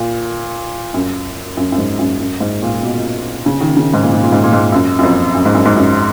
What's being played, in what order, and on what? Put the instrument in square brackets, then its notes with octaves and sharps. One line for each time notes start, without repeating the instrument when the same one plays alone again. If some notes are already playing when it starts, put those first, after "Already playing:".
Already playing: [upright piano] A#2
F#2
F#2
F#2
G#2
F#2
F#2
G#2
A#2
B2
C#3
D#3
C#3
G#2
A#2
G#2
A#2
G#2
A#2
G#2
F#2
F#2
F2
F#2
G#2
F#2
G#2
F#2